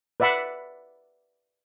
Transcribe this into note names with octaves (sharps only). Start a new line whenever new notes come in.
B4 D5 E5 F#5 B5